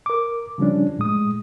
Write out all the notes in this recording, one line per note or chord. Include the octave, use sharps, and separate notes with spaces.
A#4 D6
C#3 F3 G3 C#4 D4
A2 G#3 D#6